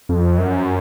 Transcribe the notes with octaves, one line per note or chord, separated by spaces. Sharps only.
F2
F#2